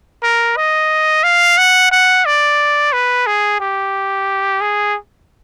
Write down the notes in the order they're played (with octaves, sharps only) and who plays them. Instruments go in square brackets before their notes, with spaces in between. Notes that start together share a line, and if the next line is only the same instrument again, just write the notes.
[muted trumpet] A#4
D#5
F5
F#5
F#5
D5
B4
G#4
G4
G#4